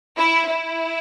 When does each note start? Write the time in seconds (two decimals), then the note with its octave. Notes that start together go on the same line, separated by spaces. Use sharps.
0.16 E4
0.47 E4